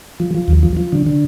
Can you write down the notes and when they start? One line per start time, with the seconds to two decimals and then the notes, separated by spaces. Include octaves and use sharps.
0.20 F3
0.35 F3
0.48 D#2
0.63 F3
0.77 F3
0.92 D3
1.07 D3